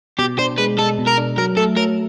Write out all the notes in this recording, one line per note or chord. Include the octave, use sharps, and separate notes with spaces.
B2 G4
D4 C5
G#3 B4
G#3 A4
B2
A#4
D4
F#3 A#4
A3 A4
F#3 A#4